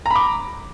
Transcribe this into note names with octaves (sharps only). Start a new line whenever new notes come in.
A#5 B5 D6